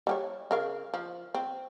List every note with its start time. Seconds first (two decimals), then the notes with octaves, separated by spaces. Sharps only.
0.07 G3 G4 C#5
0.51 C#3 A#4 F5
0.94 F3
1.34 C4